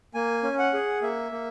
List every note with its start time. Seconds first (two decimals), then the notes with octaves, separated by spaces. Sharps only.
0.14 A#3 G#5
0.43 C#4
0.59 F#5
0.74 G#4
1.02 A#3 E5
1.32 A#3